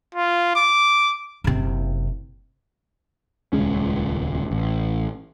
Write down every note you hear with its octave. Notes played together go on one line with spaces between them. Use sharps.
F4
D6
F#1 C3
D#1 C#2 G#3 C#4
A1